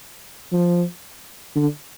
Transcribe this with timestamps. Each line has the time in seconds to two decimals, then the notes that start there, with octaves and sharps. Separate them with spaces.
0.52 F3
1.56 D3